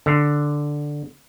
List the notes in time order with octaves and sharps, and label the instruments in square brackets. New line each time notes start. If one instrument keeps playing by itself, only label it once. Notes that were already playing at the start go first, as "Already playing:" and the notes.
[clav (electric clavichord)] D3